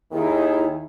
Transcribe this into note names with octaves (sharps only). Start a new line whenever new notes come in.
D#2 D#3 E4 G#4